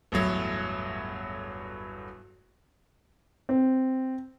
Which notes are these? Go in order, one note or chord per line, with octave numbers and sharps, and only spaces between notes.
G1 E2 A2 F#3
C4